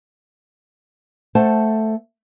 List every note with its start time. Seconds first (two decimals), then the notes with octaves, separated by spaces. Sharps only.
1.35 A3 A4 C5 F#5 A5